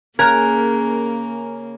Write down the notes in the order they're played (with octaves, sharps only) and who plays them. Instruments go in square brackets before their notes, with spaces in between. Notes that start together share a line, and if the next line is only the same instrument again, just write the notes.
[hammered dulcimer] C#3 [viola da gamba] A#3 [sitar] A#4 [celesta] A#5 F#6 G#6